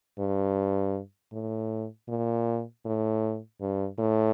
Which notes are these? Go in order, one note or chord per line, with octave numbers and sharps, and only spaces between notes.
G2
A2
A#2
A2
G2
A2